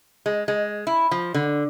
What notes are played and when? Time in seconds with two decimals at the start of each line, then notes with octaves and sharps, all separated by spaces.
0.26 G#3
0.48 G#3
0.87 E4
1.11 F3
1.34 D3